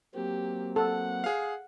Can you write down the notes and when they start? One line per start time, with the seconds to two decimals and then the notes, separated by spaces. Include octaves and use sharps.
0.15 F#3 A#3 C4 G4
0.76 A4 F#5
1.24 G#4 F5